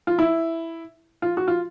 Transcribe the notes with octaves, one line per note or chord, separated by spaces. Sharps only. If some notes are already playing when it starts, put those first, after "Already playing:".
F4
E4
F4
F#4
F4